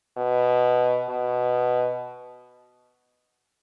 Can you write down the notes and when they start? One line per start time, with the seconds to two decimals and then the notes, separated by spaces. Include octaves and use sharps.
0.17 B2
1.09 B2